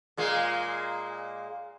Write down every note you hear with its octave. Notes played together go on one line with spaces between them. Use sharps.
A#2 G#3 A#3